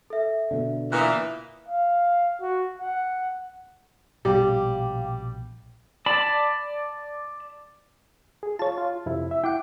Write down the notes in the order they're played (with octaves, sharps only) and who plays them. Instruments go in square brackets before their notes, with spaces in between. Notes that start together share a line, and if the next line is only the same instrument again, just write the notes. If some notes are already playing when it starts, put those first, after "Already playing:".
[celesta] A4 E5
[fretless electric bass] B2 D3
[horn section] A#2 E3 [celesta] D#6 F#6
[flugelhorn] F5
F#4
F#5
[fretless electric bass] A#1 B2 [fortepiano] G3 [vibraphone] F5 G5 D6
[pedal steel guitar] D5 A5 B5
[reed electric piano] G#4
[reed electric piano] F4 [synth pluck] C#5 A5
[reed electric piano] F4
F2 C3 E4
E5
[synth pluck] E4 F#5 [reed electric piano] G5 D6